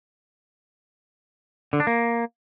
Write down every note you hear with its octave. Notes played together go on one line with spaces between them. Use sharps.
D3
D4
A#3